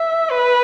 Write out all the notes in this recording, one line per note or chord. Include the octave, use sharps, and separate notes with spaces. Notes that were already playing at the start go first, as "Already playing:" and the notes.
Already playing: E5
B4